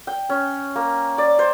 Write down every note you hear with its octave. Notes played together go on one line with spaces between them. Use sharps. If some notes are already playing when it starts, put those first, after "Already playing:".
G5
C#4
A#3
D5
C5